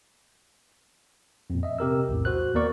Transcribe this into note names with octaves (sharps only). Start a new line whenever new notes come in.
F2 A#2
D#5 E5
C3 G4 A#4 E6
B1 E2 A2
F#4 C5 F#6
D#2 A#3 B3 A#4 D5 C#6